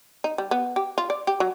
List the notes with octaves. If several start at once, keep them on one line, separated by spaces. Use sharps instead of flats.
D#4
G3
B3
G4
F4
D5
G4
F#3